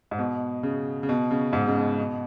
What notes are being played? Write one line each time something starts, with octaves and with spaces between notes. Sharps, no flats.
G#2
B2
C#3
C#3
B2
C#3
G#2
C#3
B2
B2